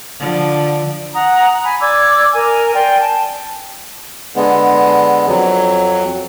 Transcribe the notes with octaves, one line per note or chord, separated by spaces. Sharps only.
D3 F3
F#5 A#5 D#6
G#5 B5
D5 D6 E6 G#6
A#4 G#5
D5 G5 G#5 C6
A5
D3 G#3 B3
F2 F#3